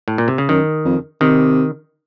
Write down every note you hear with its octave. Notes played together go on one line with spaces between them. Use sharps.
A2
A#2
C3
C#3
F#2 D#3
F2
C3 D#3